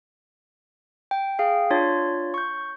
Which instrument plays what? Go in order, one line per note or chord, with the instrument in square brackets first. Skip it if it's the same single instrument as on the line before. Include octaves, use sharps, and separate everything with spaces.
[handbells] G5
G#4 F5 G5
D4 F4 C#5 A6
C#6 G6